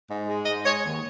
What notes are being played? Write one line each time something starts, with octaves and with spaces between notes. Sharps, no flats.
G#2
G#3
G#2 D#5
G#3 C#5
D#2